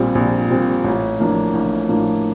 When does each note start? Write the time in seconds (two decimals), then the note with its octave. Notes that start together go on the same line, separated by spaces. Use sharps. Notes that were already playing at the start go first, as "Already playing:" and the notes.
Already playing: A#1 A#2 G3 C4
0.15 A#1
0.50 A#2 G3 C4
0.84 A1
1.19 A2 F3 A#3 D4
1.53 A1
1.89 A2 F3 A#3 D4